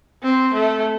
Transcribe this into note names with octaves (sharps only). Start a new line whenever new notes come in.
C4
A3